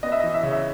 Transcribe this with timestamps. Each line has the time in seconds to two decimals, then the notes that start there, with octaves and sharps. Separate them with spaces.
0.03 B3 D#5
0.12 E5
0.20 E3 D#5
0.34 E5
0.43 C#3
0.52 E5